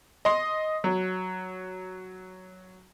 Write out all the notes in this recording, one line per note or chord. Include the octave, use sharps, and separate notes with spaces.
D#5 C6
F#3